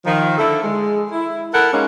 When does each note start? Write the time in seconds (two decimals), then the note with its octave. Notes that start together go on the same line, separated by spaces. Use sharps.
0.05 D#3 F3
0.38 D3 E4 A4
0.63 G#3
1.12 E4
1.53 E4 A4 A#4 F#5
1.72 G#3 A#3 C#4 D#4